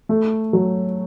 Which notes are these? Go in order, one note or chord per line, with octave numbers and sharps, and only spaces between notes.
A3
F#3